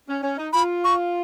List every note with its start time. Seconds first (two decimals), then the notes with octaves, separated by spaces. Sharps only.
0.08 C#4
0.23 C#4
0.38 D#4
0.53 F4 B5
0.84 C#6